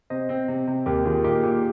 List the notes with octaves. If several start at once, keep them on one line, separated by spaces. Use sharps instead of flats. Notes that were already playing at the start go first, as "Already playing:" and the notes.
C3 C5 D#5
C4
C3
C3
D#2 G4 A#4
D#3 F4 G#4
A#2 D#4 G4
A#2